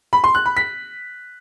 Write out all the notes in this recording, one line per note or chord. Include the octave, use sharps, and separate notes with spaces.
B5
C6
F#6
B5
B6